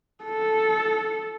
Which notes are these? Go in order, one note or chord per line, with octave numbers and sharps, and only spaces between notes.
A4